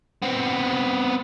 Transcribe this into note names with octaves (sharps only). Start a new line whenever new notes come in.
B3 C4